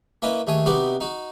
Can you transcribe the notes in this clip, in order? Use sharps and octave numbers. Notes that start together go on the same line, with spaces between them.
A#3 C#4 E4 B4 D#5
D#2 A3 G#4 C#5 D#6
C3 B3 D#4 F#4 D5
D#4 F#4